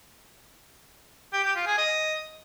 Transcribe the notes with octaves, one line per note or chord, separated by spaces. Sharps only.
G4
G4
F4
G#4
D#5